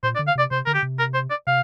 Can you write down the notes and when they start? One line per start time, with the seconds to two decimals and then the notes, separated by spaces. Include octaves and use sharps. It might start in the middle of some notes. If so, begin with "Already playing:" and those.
0.03 A#2 C5
0.15 D5
0.19 D3
0.27 F5
0.35 C3 D5
0.51 C3 C5
0.66 D3 A#4
0.74 G4
0.83 C3
0.99 A#4
1.14 C5
1.30 D5
1.47 C3 F5